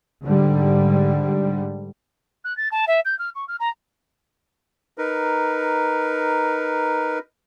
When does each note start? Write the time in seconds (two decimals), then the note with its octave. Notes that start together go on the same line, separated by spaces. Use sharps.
0.24 G#2 D3 G3
2.44 F#6
2.57 A6
2.71 A5
2.87 E5
3.05 G6
3.19 F6
3.35 C#6
3.48 F6
3.60 A#5
4.98 D#4 A#4 B4